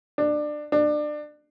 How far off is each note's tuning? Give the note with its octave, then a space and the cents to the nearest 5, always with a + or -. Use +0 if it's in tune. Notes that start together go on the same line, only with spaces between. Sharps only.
D4 +20
D4 +25